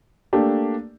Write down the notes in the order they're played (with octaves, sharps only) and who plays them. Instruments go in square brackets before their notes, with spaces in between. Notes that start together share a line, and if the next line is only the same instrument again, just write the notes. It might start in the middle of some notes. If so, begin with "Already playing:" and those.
[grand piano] A3 A#3 D4 G4